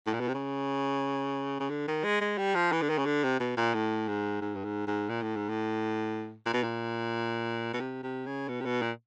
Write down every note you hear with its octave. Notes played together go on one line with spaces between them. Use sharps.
A2
A#2
B2
C3
C#3
C#3
D3
D#3
G#3
G#3
G3
F3
E3
D3
D#3
C#3
D3
C3
B2
A#2
A2
G#2
G#2
G2
G#2
G#2
A#2
A2
G#2
A2
A#2
B2
A#2
B2
C3
C3
C#3
B2
C3
B2
A#2